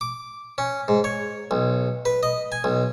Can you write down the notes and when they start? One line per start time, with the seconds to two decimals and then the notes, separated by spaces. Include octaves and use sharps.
0.01 D6
0.58 C#4
0.88 G#2
1.04 C#5
1.51 B1
2.05 B4
2.23 D#5
2.52 G#5
2.64 B1